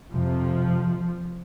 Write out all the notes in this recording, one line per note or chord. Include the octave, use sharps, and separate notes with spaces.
F2 C3 F3